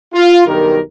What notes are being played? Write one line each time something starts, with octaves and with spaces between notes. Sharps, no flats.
F4
B1 G2 D#3 G4 A#4